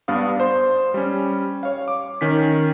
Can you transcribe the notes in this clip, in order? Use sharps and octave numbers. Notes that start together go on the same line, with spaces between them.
G2 B3 D4 F5 D#6
C5 C6
G3 C#4
C#5 F5
D6
D#3 C#4 B6